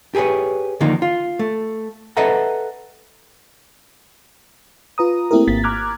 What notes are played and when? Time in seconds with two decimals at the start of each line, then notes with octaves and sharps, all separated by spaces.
0.15 G4 G#4 A#4 B4 C#5
0.81 D3 D#3 F3 A#3 D#4
1.02 F4
1.39 A3
2.17 A4 B4 D#5 E5 F#5 A#5
4.98 F4 B4 A#5 D#6
5.31 A3 A#3 C4 E4 G4 A#4
5.48 G#1 A#3 A6 B6
5.64 A#5 D6 F6 F#6 G#6